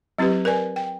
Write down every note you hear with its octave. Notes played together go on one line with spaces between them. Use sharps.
F#3 C4 E4 G4 B4
A#4 B4 D5 G#5
G5